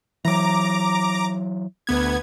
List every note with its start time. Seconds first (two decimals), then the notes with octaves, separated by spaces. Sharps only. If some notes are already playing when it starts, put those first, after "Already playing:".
0.25 E3 F#3 A#5 D6
1.87 D2 B3 G#6